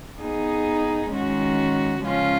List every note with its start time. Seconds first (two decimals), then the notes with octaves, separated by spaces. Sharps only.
0.21 B3 D#4 G#4
1.12 D#3 G#3 C#4 F#4
2.02 C#3 F3 G#3 C#4 F4